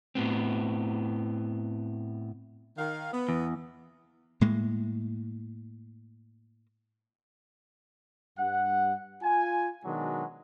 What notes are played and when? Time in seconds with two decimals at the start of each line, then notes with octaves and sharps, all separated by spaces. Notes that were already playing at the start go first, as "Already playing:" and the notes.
0.15 A2 B3 C4
2.78 D#3 F5
3.13 B3
3.29 E2
4.41 A2 G#3 A#3
8.39 G2 F#5
9.23 F4 G#5
9.85 B2 D#3 F#3 G#3 D4